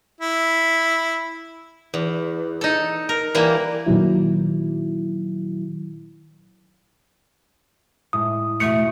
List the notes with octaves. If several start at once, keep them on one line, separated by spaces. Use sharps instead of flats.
E4
E2
D#4 A4
A#4
E3 G3 A#3 E4
A#2 D#3 F#3 E4
A2 G#3 D#6
E2 B2 A3 C#7